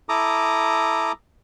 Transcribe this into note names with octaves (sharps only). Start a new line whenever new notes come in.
E4 A4 A#5 D6 D#6